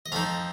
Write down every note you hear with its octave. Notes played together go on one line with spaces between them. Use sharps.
D#5
F2 F3 D#4 F5